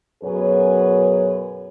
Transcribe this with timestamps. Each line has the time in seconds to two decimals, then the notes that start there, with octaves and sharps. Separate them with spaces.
0.23 F#2 B2 F#4 G#4 B4 C#5